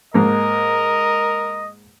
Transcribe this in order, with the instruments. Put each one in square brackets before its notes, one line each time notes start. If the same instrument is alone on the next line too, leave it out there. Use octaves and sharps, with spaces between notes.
[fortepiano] G#2 A#3 [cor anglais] A#4 [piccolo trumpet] D#5